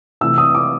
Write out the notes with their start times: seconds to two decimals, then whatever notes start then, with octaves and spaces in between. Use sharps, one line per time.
0.21 C3 E3 A3 E6
0.38 D#6
0.55 D6